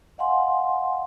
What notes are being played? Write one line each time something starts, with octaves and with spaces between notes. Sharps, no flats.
D#5 F5 F#5 G#5 C6